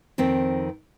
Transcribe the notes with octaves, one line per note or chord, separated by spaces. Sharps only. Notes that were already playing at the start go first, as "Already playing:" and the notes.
F2 D#3 C4 G5